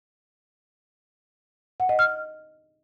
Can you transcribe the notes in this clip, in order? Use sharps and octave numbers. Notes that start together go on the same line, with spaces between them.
F#5
D#5
F6